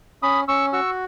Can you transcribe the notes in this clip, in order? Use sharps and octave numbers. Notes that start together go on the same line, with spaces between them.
C#4 B5 D#6
C#4 C#6 E6
F#4 C#6 E6